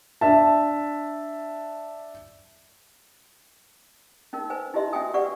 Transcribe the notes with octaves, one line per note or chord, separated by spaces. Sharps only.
D4 E5 A5
C#4 D#4 A#4
B4 C5 G#5
D#4 E4 G4 D#5 E5 C6
C#4 F#4 E5 G5 G#5 D#6
G4 B4 D5 F#5 C#6